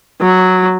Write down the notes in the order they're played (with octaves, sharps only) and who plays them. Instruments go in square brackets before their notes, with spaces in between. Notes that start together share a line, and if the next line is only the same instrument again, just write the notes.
[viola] F#3